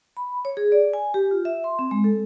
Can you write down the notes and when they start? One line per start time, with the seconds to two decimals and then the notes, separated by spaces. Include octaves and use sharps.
0.17 B5
0.45 C#5
0.57 G#4
0.72 D5
0.94 G#5
1.14 G4
1.31 F4
1.45 E5
1.64 C6
1.79 C4
1.91 G#3
2.04 A4